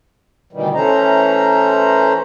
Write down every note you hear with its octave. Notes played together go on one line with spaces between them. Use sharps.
D2 B2 D#3 E3 G3
E3 A3 C#4 C5 A#5